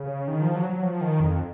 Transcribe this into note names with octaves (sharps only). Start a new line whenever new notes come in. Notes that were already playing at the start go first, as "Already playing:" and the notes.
Already playing: C#3
D#3
F3
F#3
F#3
F3
D#3
F2